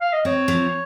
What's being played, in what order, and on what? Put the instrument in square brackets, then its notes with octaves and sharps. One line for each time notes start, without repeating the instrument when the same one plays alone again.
[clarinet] F5
D#5
[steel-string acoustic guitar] C4 [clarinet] C#5
[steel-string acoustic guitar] F3